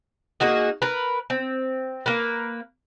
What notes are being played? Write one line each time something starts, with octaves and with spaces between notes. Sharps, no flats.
A#3 D#4 F#4 G#4
A#4 B4
C4
A#3 A#4 B4